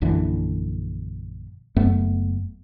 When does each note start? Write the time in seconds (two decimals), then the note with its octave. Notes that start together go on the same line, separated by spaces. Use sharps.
0.02 A#1 F#2 D3 E3
1.76 F#1 F#2 A3 B3